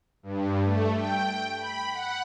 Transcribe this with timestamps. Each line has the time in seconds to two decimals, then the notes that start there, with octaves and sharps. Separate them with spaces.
0.23 G2
0.65 A3
0.96 G5
1.57 B5
1.91 F#5